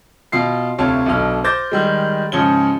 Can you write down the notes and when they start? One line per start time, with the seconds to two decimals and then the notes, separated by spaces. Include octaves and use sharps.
0.32 B2 F4 C7
0.78 D2 C3 F4 C#5 A5 F6
1.06 B1 B2 D3 F6
1.44 C5 D6 G6 A6 A#6
1.71 D#3 G3 G#3
2.32 G#2 C#3 F3 C#5 G7